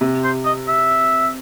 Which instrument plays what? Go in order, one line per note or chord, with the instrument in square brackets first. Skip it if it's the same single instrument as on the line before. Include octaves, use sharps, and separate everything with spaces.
[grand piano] C3
[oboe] C5
D#5
E5